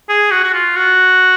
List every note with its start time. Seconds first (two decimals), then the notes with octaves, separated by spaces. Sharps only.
0.09 G#4
0.31 F#4
0.44 F#4
0.53 F4
0.76 F#4